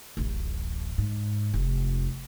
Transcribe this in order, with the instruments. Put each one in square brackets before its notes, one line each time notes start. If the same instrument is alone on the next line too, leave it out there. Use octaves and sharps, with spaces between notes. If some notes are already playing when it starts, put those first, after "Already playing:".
[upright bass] D1 A1
G#2
F1